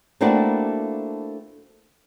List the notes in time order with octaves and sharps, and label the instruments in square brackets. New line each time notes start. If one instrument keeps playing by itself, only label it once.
[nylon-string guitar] A3 A#3 C4 D4 E4 F#4